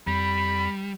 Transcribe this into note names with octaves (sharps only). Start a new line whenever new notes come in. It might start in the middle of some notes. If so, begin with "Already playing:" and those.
F2 G3 B5